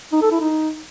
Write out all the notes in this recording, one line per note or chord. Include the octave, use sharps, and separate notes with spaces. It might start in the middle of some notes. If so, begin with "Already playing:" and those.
D#4
A4
E4
D#4